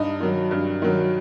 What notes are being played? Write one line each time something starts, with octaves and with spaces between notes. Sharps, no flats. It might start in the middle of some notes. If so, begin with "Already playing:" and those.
Already playing: G2 D#4
D#3 F#3
G2
D#3 F#3